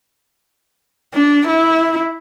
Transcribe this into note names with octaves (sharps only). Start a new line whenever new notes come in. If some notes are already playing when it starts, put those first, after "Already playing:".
D4
E4